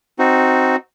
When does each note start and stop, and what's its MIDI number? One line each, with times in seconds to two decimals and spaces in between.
0.19 0.76 60
0.19 0.76 63
0.19 0.76 66